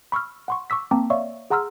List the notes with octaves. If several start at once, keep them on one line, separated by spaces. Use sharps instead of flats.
B5 C#6 E6 F6
F#5 C6 C#6
C#6 D6 E6 B6
A#3 C4 G5 A5 A#5 D6
C#5 D5 E5 F5 C#6
G#4 F#5 A#5 C6 E6 F6